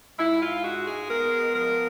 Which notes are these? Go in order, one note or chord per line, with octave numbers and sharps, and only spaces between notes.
G#2 E4
F4
G#3 F#4
G#4
B3 A#4
F3 A#4